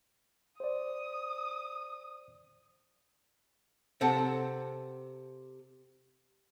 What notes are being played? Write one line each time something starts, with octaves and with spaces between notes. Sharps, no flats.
C5 D5 D#6
C3 A4 F#5 A5